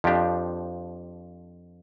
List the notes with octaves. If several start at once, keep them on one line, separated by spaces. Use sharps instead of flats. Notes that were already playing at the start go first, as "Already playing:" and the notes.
F2 F3 D4 G4